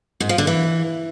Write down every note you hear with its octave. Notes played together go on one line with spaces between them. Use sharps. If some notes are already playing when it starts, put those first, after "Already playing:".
G#2
F3
D3
E3